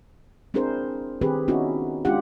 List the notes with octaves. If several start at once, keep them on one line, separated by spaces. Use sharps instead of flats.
C4 D4 E4 G#4 A#4 C5
D#3 C4 G4 G#4 B4
B3 C#4 D#4 E4 F#4
G#3 C#4 D4 F4 G4 F#5